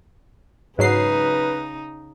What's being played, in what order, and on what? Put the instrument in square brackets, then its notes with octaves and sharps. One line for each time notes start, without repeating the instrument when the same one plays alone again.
[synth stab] G#2 F#3 C7 [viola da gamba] C#3 D#4 [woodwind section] B4